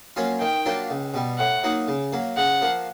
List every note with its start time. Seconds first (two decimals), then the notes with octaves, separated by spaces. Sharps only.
0.16 F#3 A#3 C#4 F4
0.41 D#3 G5
0.65 F#3 A#3 D4 F4
0.90 C#2
1.14 B2 G3
1.38 A2 F#5
1.63 F#3 A#3 D#4
1.88 C#3
2.13 F#3 A#3
2.37 C#3 F#5
2.61 F3 A#3